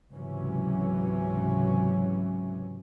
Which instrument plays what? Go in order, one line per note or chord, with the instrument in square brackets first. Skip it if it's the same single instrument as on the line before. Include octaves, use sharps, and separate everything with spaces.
[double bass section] C#2 G#2 C3 E3 F#3 C#4